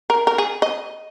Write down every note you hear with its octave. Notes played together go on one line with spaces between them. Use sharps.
A#4
A#4
G#4
D#5